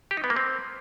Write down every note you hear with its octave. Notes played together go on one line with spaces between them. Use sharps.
G4
D#4
B3
A#3
C4